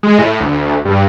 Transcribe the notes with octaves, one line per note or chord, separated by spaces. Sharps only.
G#3
A2
D2
G2